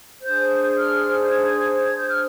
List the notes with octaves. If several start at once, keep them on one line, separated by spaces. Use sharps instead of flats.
D4 G#4 C5 G6
F6
G6
G#6
G#6
G6
F6